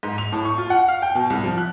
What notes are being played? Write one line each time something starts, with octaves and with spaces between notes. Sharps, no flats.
G#2
F7
A2
C#6
F4
F#5
F5
G5
B2
C2
F3
F#6